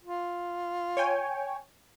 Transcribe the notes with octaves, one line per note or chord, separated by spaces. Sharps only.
F4
C#5 G5 G#5